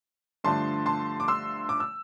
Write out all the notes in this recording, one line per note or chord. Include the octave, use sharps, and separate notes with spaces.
G2 D3 F3 A3 D4 A5 C6
A5 C6
D6
C6 E6
D6
E6